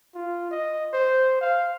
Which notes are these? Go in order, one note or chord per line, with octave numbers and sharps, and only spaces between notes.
F4
D#5
C5
F5